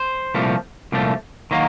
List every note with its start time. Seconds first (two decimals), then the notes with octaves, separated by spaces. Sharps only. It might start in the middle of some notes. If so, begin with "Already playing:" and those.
Already playing: C5
0.35 C2 A#2 F3 A3
0.92 C2 A#2 F3 A3
1.51 D#3 F#3 A#3